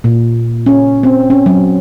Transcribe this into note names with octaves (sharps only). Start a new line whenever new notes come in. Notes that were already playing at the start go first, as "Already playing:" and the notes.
A#2
C#4
C4
C#4
F#3